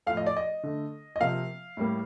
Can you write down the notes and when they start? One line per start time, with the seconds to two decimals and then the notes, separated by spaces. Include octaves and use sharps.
0.07 A2 F3 A3 F5
0.17 D#5
0.26 D5
0.37 D#5
0.63 D3 A3
1.16 D#5
1.20 C3 F3 A#3 F5
1.77 A2 G3 A#3